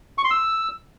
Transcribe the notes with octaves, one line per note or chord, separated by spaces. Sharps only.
C#6
C6
E6